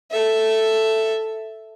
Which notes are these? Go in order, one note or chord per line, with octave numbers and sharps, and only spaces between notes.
A4 E5